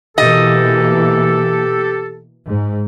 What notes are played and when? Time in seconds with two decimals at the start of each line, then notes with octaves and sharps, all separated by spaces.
0.18 B2 E3 A#3 G4 A4 D#5
2.47 G#2